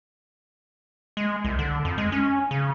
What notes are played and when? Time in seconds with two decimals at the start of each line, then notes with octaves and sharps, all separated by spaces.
1.17 G#3
1.44 C2
1.59 D3
1.85 F2
1.98 G#3
2.12 C#4
2.51 C#3